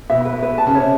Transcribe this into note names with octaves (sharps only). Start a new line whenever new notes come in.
B2 E5
B4
B4
A5
C#3
C3 C#5